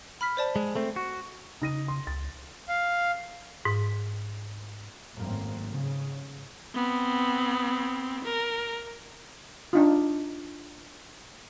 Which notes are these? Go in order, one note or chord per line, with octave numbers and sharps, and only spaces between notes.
B5 F6 B6
C5 D5 A5
G#3
A3 C4
F#4
C#3 D#4 A#6 D#7
C6
C#2 A6
F5
G#2
G#1 F#2 A2 A#3 C4
G#2 C#3
B3 C4
A#4
D4 D#4 F4